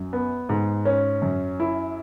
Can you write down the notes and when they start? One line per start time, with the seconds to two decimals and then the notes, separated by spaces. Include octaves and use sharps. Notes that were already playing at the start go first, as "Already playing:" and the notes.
Already playing: F#2
0.13 B3
0.49 G#2
0.85 C#4
1.22 F#2
1.60 E4